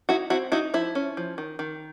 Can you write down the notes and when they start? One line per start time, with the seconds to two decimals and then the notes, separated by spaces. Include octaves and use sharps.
0.09 D#4 E4 F#4
0.30 C4 E4 F#4
0.52 D#4 E4 F#4
0.74 F3 E4
0.95 C#4
1.17 F3
1.38 D#3
1.59 D#3